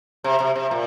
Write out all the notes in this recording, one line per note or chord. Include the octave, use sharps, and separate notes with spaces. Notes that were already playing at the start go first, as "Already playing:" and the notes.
C3
C3
C3
A#2